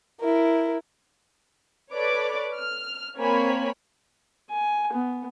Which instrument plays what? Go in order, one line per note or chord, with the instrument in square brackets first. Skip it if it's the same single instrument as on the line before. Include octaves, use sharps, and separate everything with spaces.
[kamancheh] E4 A#4
[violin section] A4 B4 C#5 D5 D6
F6
A#3 C4 C#5 G#5 B5
[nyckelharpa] G#5
B3